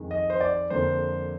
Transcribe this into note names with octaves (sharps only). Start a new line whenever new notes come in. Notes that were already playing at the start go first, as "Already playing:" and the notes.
Already playing: F2 D#3 G#3
D#5
C5
D5
F2 D3 F3 A#3 C5